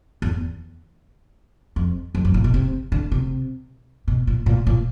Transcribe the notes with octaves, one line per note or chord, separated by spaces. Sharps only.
E2
F2
F2
F#2
A#2
B2
C3
D3
C3
B2
A#2
A#2
A#2